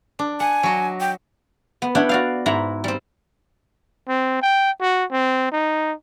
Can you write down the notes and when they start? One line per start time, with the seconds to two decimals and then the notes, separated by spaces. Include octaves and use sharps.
0.19 D4
0.40 F#5 G#5
0.63 F#3 F#4 D#5
1.00 G5
1.82 B3
1.95 D4 E4 C#5 F#5 G5
2.09 F#4 D5 F5
2.46 G#2 E4 A#5 B5
2.84 G3 C4
4.08 C4
4.42 G5
4.81 F#4
5.11 C4
5.52 D#4